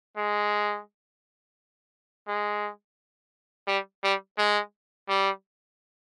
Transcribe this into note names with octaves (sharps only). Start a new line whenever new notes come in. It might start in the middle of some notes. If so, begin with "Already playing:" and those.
G#3
G#3
G3
G3
G#3
G3